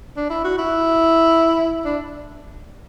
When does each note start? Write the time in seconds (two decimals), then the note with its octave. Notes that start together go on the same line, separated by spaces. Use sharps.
0.17 D4
0.30 E4
0.44 F#4
0.59 E4
1.85 D4